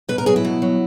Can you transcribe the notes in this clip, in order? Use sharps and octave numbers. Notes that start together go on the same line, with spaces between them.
B2 B4
A#4
F#3 G#4
E4
B2
F#3